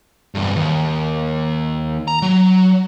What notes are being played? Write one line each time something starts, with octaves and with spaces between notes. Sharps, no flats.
E2 G2
D#2
A#5
F#3